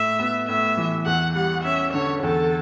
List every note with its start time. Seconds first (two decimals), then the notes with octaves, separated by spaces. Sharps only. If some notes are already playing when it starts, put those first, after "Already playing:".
Already playing: A2 E5
0.19 B3
0.48 A2 E5
0.77 E3
1.06 E2 F#5
1.35 G3 F#5
1.64 C#4 E5
1.93 D3 C#5
2.23 E2 A4